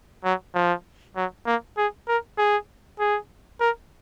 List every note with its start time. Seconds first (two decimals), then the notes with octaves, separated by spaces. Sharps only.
0.24 F#3
0.54 F3
1.16 F#3
1.46 A#3
1.77 G#4
2.08 A#4
2.38 G#4
2.99 G#4
3.61 A#4